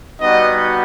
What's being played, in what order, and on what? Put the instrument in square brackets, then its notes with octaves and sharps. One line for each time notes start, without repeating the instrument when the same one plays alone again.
[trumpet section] G3 B3 D#4 F#4 D#5